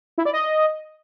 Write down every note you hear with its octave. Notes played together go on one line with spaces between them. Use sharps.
E4
D5
D#5